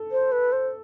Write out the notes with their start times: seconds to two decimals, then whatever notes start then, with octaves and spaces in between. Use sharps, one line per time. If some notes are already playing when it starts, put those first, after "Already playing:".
Already playing: A4
0.11 C5
0.32 B4
0.52 C5